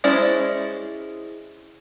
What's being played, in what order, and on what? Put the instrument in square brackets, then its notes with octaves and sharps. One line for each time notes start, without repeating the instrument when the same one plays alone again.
[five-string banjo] G#3 C#4 E4 C5 D5